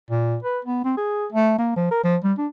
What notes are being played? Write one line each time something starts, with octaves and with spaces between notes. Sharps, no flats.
A#2
B4
B3
C4
G#4
A3
A#3
F3
A#4
F3
G3
D4